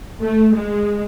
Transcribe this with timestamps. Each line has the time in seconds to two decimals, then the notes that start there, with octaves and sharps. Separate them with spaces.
0.23 A3
0.55 G#3